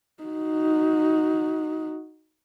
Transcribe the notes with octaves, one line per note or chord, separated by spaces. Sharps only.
D#4 F#4